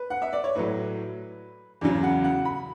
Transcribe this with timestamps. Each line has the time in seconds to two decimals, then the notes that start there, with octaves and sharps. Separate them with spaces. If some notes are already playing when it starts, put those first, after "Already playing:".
Already playing: B4
0.10 F#5
0.22 E5
0.33 D5
0.44 C#5
0.56 A2 F#3 B4
1.81 E2 C#3 F#3 D5
2.03 F#5
2.24 F#5
2.45 B5